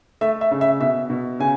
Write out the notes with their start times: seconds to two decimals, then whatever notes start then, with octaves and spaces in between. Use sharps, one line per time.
0.21 A3 E5
0.41 E5
0.51 C#3
0.61 E5
0.80 B2 E5
1.10 B2
1.40 C#3 G#5